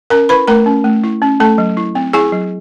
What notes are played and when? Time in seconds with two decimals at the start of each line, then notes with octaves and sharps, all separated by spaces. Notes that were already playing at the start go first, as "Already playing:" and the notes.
0.10 C#4 A#4 A#5
0.29 E4 B4 B5
0.48 A3 A#4 A#5
0.66 C#4
0.84 A3
1.04 E4
1.22 C#4
1.40 A3 A4 A5
1.58 F#3
1.77 E4
1.95 C4
2.13 E4 G#4 G#5
2.32 F#3